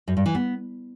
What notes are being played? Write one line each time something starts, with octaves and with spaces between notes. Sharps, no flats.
F#2
G2
E3
B3